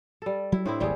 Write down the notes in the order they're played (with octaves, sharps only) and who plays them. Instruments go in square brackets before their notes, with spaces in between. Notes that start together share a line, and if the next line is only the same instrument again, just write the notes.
[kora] G3 A4
[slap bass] F#3 [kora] E4
[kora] A2 C4 E4 [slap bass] D4
[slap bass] D#1 G#1 [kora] G3 G4 G#4